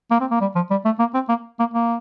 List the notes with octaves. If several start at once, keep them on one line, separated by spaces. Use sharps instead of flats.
A#3
C4
A#3
G3
F3
G3
A3
A#3
C4
A#3
A#3
A#3